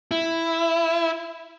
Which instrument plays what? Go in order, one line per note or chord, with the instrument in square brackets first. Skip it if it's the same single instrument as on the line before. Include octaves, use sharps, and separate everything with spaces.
[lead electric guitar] E4